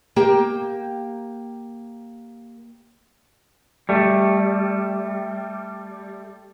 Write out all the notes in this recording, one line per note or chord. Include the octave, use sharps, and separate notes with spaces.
A#3 G4 G5
G3 A3